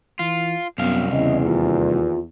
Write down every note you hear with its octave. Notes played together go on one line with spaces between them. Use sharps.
E3 F4
C2 F#2 B3 F5
E2 C#3 D#5
D#2 F4